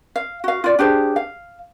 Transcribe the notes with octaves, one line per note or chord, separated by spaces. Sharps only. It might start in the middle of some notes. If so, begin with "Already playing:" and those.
F5
F#4 F5
F4 D5
D4 G4 G#4 C5
F5